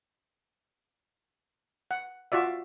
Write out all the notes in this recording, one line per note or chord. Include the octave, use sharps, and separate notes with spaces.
F#5
F4 F#4 D5 E5